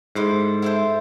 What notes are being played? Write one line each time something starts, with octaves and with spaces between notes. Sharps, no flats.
G#2 E4 A4 C5
E4 A4 C5